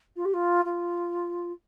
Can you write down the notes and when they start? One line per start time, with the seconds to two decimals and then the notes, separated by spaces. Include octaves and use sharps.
0.16 F4
0.25 G4
0.33 F4
0.65 F4